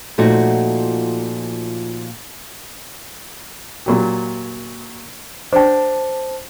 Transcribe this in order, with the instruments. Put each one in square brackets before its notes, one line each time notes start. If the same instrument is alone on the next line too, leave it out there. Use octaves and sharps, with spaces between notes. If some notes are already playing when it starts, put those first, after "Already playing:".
[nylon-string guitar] A#2 F3 A3 D#4 F#4
[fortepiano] A#2 F#3 G4
[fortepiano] D4 G5 [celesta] C5 A5